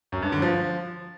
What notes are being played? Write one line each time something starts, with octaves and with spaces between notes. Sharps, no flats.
F#2
G2
D3
F3